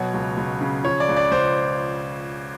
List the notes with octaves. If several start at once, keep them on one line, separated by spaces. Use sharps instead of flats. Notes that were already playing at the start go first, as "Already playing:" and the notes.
Already playing: B2 F#3 C#5
C#2
C#2
C#3
F3 C#5
D5
C#2
D5
C#2 C5